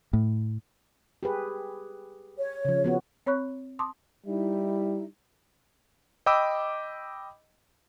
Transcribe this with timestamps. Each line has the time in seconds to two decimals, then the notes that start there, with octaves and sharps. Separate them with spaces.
0.13 A2
1.23 G4 G#4 B4
2.38 C#5
2.65 C#3 F3
2.84 F3 B3 F#4
3.26 C4 C#5 B5 C#6 F#6
3.79 A5 C6 D6 D#6
4.26 G3 D#4 E4 E5
6.26 D#5 G5 B5 D6 E6